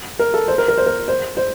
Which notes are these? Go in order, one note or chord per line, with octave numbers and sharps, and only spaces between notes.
A#4
A4
C5
A#4
A#4
C5
A#4
C5
C5